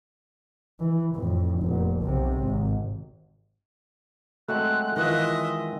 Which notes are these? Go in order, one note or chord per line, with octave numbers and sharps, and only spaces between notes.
E3
F2 A2
F1 A#2
B1 C3
G#1
F#3 G#3 A3 C4 F#4 F#6
D#3 E3 F4 D#5 E5